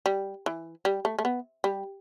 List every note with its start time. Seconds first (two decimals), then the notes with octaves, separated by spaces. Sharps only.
0.06 G3
0.46 E3
0.85 G3
1.05 A3
1.19 A3
1.25 B3
1.64 G3